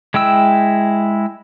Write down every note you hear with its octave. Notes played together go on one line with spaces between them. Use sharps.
G#3 E4 G5 E6